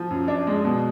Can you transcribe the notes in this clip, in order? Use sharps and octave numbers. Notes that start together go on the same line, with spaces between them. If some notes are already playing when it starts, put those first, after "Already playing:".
Already playing: F3
F#2
D4
G#3
B2